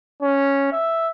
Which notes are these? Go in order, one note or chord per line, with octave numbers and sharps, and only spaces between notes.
C#4
E5